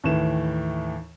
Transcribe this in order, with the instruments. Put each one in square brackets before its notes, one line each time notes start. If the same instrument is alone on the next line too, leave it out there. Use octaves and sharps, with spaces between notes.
[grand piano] D#2 A2 D#3 E3 E7